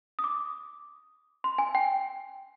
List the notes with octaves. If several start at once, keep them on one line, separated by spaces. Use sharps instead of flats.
D#6
D6
C6
G#5
G5